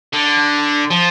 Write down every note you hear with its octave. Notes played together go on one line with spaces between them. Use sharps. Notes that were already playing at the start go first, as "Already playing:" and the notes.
D3
F3